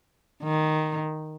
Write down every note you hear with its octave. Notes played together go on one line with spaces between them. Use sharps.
D#3